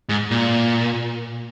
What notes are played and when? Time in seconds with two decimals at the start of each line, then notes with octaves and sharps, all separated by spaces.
0.09 G#2
0.31 A#2